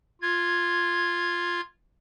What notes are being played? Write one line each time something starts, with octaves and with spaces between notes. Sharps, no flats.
F4 G#6